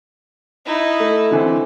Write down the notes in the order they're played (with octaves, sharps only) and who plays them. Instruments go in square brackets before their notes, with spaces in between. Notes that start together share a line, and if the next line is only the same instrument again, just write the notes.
[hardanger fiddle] D#4 E4
[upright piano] A3
D3 E3 C4